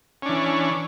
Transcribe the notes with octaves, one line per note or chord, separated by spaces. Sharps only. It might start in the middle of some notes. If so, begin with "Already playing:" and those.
E3 C#4 D4